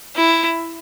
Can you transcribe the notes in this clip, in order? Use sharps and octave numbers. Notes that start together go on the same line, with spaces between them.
E4